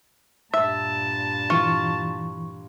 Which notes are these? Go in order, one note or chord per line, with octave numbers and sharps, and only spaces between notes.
G2 A#2 E5 A5
E3 F4 C#6